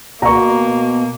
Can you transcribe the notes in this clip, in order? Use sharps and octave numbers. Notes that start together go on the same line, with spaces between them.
B2 A#3 A#5 C#6